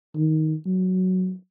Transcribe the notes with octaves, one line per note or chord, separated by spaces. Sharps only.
D#3
F#3